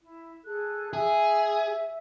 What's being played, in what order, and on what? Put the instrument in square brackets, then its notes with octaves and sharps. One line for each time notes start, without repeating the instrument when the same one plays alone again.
[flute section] E4
G#4 A4 F#6
[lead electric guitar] G#4 [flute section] E5